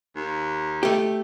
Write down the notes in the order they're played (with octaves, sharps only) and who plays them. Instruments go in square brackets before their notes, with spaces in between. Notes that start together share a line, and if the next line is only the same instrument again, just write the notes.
[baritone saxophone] D#2
[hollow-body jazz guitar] A3 G4